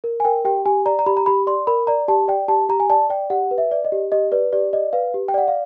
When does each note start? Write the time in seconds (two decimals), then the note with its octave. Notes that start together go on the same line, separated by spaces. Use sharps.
0.04 A#4
0.20 G#5
0.25 A#4 G5
0.45 G4 G5
0.66 G4 G#5
0.86 D5 A#5
0.99 A#5
1.06 G4 B5
1.17 A#5
1.26 G4 B5
1.47 D5 C6
1.67 A#4 B5
1.87 D5 A#5
2.08 G4 A5
2.28 D5 G5
2.48 G4 A5
2.69 G4 A#5
2.80 G#5
2.90 D5 A5
3.10 D5 G5
3.30 G4 F#5
3.51 B4
3.58 E5
3.71 D5
3.85 D#5
3.92 G4
4.12 G4 D#5
4.32 B4 D5
4.53 G4 D5
4.73 D5 D#5
4.93 B4 F5
5.14 G4
5.28 G5
5.34 D5 F#5
5.48 F5